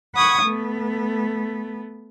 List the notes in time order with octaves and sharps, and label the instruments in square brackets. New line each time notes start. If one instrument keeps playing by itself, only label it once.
[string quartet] F#5 B5 C#6 D#6 G#6
A3 B3